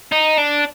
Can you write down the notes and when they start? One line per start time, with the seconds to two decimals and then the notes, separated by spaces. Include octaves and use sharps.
0.12 D#4
0.38 D4